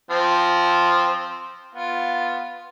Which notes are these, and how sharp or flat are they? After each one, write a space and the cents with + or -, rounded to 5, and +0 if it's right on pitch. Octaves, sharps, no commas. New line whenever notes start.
F3 +0 C4 +0
B3 +0 F4 +0